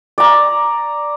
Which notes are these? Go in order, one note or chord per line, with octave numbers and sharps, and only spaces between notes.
D5 A#5